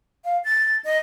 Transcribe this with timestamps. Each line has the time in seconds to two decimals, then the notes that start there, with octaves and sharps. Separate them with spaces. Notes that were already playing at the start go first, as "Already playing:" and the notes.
0.25 F5
0.44 A6
0.84 D#5